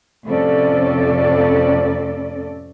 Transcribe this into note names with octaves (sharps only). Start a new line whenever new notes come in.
F2 A2 C3 C#4 A4 D5